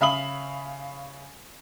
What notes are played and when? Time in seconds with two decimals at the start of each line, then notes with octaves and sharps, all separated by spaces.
0.01 C#3 E5 F5 B5 D#6 F#7